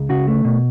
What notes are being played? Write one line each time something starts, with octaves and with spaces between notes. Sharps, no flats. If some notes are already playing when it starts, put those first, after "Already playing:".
Already playing: C#2
C#3 F#4
A3
B2